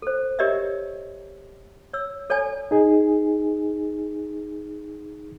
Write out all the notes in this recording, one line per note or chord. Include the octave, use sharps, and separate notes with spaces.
A4 C5
G4 A#4 C#5 D#5 E5
C#5 E6
A4 C#5 D5 G#5 A5
D#4 G#4